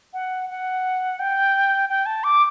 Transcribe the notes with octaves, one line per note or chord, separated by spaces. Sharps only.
F#5
F#5
G5
G5
A5
D6